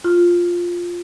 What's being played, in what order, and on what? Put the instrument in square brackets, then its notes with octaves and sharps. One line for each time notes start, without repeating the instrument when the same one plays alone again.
[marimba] F4